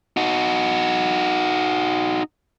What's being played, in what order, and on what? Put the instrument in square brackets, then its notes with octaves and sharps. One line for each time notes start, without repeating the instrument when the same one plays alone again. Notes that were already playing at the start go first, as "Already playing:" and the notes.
[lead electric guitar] D#4 F#4